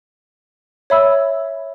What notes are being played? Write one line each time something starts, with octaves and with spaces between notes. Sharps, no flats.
C#5 E5 B5 E6